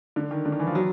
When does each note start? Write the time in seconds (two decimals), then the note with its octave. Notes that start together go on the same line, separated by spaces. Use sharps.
0.16 D3
0.31 D#3
0.45 D3
0.52 D#3
0.60 E3
0.67 F3
0.75 F#3